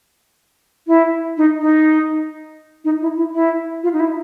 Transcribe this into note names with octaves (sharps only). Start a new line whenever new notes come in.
E4
D#4
D#4
D#4
E4
E4
E4
F4
D#4
E4